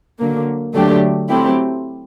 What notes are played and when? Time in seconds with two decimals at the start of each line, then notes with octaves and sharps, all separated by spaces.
0.19 D3 F#3 A#3
0.75 D3 F#3 A3 D4 G4
1.29 F#3 A3 C4 E4 G4